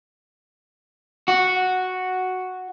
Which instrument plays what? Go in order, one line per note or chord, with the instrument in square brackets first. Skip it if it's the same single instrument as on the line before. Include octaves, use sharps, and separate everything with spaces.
[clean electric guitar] F#4